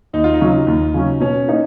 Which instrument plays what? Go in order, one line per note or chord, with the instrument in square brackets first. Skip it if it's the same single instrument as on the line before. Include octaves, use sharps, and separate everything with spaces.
[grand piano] D#2 [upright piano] D#4
[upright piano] F4
D#4
[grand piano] C#3 F#3 C#4
D#2
C#3 F#3 C#4
[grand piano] B2 [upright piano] C#4
[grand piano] A#3 D#4